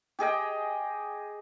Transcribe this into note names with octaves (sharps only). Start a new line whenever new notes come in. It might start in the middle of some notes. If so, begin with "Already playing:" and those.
G4 G#4 D#5 G5